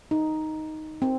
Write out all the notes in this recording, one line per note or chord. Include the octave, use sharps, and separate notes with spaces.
D#4
C4